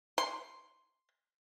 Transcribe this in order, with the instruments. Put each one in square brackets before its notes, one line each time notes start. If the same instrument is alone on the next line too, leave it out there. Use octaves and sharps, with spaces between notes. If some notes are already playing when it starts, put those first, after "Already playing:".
[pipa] C6